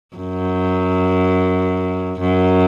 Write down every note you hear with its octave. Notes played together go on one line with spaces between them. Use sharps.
F#2
F#2